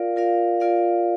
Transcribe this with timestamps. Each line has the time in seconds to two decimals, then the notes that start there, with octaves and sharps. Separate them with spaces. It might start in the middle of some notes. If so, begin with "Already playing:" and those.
Already playing: F4 A#4 D5 F5
0.16 F4 A#4 D5 F5
0.60 F4 A#4 D5 F5